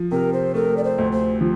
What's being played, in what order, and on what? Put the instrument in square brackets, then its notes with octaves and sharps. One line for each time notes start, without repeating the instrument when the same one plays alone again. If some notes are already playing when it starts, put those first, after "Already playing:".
Already playing: [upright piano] F3
[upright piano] C3 [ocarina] A#4
[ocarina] C5
[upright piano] A3 [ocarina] A#4
[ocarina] D5
C5
[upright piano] D2
[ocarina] C5
[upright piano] F3